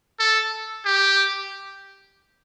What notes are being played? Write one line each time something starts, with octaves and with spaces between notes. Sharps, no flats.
A4
G4